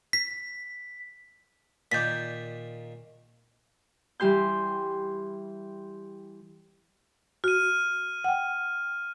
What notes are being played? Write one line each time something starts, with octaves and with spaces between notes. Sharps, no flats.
B6
A#2 D#3 D5 G6 A6 B6
E3 G3 G4 C6 G6
F#4 F6 D#7
F#5 G5